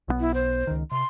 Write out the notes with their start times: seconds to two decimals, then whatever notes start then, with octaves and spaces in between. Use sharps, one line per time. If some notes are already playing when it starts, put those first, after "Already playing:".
0.08 B1 D#3 B3
0.20 E4
0.34 C5
0.67 C#2 D#3
0.91 C3 C6